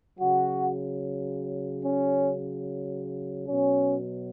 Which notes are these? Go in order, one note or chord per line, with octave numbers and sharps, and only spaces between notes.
C#3 F#3 F#4
C#4
B2 F#3 C#4